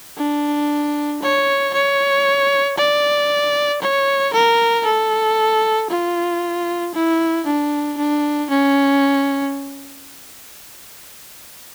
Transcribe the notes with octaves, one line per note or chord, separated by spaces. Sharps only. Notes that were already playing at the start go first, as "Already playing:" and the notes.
D4
C#5
C#5
D5
C#5
A#4
A4
F4
E4
D4
D4
C#4